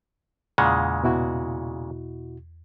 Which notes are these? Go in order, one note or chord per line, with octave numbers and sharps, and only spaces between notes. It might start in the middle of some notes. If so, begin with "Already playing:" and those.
E2 A#2 C#3 G#3 F#5
B2 E4 F#4